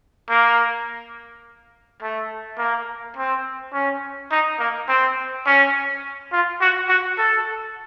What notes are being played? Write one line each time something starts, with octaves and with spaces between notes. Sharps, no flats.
A#3
A3
A#3
C4
C#4
D#4
A#3
C4
C#4
F4
F#4
F#4
A4